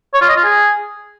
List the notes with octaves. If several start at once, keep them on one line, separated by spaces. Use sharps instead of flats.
C#5
F4
D#5
F4
G#4